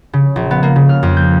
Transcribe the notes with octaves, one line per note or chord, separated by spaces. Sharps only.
C#3
A#1
B3
A#3
C#3
F6
F2
G6